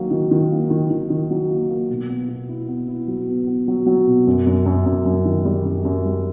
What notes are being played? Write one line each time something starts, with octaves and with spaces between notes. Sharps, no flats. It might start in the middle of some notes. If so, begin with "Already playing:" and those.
Already playing: D#3 F#3 A#3
D#3
D#3
A#3
D#3
D#3
D#3
F#3
A#3
A#3
B2
B3
B2
E4
B3
E4
F#3
B3
B3
F#3
F#3
B2
F#2
F#2
F#2
F#2
F#2
D#3
G3
F#2
F#2
G3